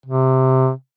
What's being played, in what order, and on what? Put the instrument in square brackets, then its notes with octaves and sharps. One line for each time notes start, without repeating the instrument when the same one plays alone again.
[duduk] C3